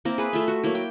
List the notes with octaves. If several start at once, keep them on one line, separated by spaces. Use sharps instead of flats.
A#3 C4 E4 A#4
G#4 B4
A3 F4 E5
F#4
F#3 A#3 E4
G5